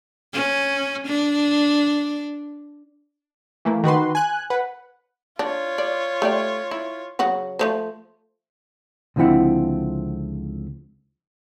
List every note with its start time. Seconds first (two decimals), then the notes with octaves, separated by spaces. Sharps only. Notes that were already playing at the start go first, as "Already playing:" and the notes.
0.33 C#4
1.07 D4
3.65 E3 A3 A#3
3.84 D#3 F#4 B4 C6
4.15 G#5 F#6
4.50 B4 F#5
5.39 D4 F4 C#5
5.78 D5
6.22 A3 G4 D5
6.71 E4
7.19 C#3 F#3 F#4
7.59 F3 A3 C5
9.16 C#2 D3 F3 C4 E4 F#5